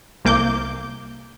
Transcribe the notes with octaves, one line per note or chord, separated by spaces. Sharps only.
C2 A#3 D6 G6